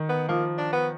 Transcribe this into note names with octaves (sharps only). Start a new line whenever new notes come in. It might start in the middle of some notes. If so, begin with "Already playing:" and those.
Already playing: D#3
B3
F3 A#3
D4
B3